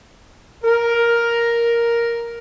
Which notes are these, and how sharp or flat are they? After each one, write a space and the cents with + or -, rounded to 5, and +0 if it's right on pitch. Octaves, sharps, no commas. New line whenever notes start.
A#4 +5